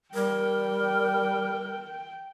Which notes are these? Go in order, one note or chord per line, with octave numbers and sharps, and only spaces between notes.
G3 A#4 G5